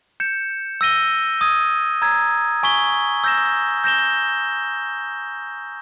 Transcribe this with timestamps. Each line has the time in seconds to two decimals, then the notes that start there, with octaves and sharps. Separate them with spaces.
0.20 G6 C#7 E7
0.81 E6 A#6 D#7 G7
1.41 D#6 G#6 D#7
2.02 A#5 E6 G#6
2.63 G#5 C#6 G#6 B6 G7
3.24 E6 G6 A#6 E7
3.84 G6 A#6 E7 G7